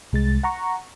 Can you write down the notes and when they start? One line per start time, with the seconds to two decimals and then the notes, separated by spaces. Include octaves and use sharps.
0.12 C2 G#3 A6
0.43 F#5 A#5 C#6